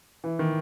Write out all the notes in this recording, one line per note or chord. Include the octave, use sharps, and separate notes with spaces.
E3
D#3